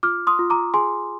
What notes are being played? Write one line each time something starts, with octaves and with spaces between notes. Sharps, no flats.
F4 D6 F6
C6 D#6
F4
A#5 D6
G#4 G#5 C6